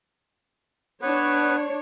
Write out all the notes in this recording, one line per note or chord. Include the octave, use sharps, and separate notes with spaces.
B3 D4 B4 C#5